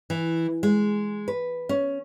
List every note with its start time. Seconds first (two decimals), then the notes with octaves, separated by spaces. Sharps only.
0.10 E3
0.63 G#3
1.28 B4
1.69 C#4